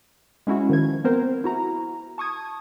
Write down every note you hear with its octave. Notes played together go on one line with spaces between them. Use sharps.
G#3 C#4 E4 F#4
D#3 F3 G#6
B3 C4 A#4 C5
E4 F#4 A#5
A5 C#6 D#6 G#6